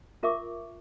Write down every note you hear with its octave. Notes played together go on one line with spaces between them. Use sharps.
F4 A#4 E5 C#6 D6